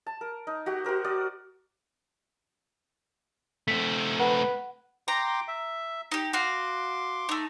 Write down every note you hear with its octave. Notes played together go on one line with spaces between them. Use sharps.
A5
A#4
D#4
F#4 G4 F#5
F#4 G4 A#4 C5
F#4 D5 D#6
A3 C4 B6
B4 F#5
G5 A#5 C6 D6
E5
D#4 G4
F#4 F5 C6 D6
A3 D#4